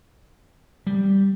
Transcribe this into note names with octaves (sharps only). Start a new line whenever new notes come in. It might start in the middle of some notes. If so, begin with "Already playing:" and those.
G3